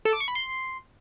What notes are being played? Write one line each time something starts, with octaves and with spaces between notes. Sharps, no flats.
A4
D6
C#6
B5
C6